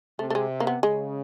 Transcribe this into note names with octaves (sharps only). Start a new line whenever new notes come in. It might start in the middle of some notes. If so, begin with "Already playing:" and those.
C3 A3
A3
G#3
A#3
B3
C#3 G#3